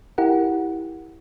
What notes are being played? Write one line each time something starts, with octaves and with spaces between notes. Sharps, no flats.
E4 G4 A#4 F#5